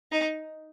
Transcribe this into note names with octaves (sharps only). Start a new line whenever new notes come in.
D#4